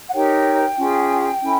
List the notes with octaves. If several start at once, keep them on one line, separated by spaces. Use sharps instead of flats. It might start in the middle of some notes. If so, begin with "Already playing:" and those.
F#5
D#4 G4 A#4 C#5 G5
C#4 F4 G#4
C#4 E4 A4